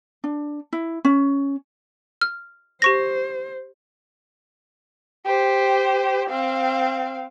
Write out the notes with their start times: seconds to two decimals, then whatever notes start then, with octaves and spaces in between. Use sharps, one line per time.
0.24 D4
0.73 E4
1.05 C#4
2.21 F6
2.82 G4 C5 C#6 A#6
5.26 G4 C5
6.29 C4 F5